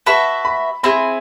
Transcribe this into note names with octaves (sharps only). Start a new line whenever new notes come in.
F#4 B4 E5 A5 B5
B5
C4 E4 G#4 B5